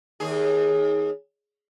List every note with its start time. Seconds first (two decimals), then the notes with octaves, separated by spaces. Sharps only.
0.20 D#2 G#4